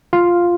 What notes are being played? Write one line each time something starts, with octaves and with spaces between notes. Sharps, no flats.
F4 F5